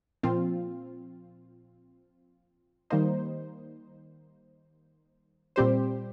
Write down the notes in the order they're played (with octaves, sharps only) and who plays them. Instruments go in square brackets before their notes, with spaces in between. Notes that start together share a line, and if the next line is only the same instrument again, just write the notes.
[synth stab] A#2 F3 C4 F4
D#3 G3 A#3 D#4 C5
A#2 G3 C4 G4 C5